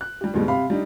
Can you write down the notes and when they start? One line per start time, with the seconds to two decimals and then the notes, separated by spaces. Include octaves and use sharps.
0.01 F#6
0.21 G3 G4
0.34 D#2 B2 G3 G#3
0.48 C3 G4 F5 B5
0.70 G3 D4 D#4